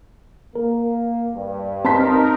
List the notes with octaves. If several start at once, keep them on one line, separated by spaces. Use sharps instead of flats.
A#3 A#4
G2
C4 D#4 A#4 A5 C6 B6